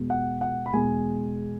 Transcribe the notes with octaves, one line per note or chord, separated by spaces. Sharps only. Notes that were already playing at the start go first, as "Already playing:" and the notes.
Already playing: E2 B2 G#3
F#5
F#5
B5
E2 B2 G#3 G#5